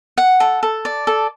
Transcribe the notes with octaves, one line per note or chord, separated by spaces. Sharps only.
F#5
A4
A4
D5
A4